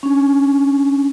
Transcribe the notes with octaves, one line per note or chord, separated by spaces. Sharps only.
C#4 D4